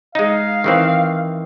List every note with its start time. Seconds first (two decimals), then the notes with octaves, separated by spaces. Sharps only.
0.15 G#3 D#4 F5
0.64 D#3 E3 C4